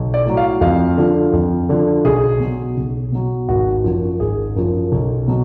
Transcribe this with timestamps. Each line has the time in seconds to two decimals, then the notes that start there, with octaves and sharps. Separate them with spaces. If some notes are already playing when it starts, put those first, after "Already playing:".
Already playing: B1
0.14 D5
0.25 A2 F#3
0.37 F5
0.61 F2 F5
0.97 D3 F3
1.33 F2
1.69 D3 F3
2.05 B1 G#4
2.40 B2 F#3
2.77 B1
3.12 B2 F#3
3.49 G#1 F#4
3.84 F#2 F3
4.20 G#1 G#4
4.56 F#2 F3
4.92 B1
5.28 B2 F#3